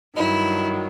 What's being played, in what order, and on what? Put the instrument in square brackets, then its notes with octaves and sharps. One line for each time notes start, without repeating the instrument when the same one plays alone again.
[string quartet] G2 D#3 F#3 E4